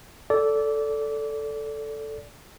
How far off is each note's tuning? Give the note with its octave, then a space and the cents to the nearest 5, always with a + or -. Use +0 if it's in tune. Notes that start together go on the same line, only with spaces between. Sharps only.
A4 +0 D5 -20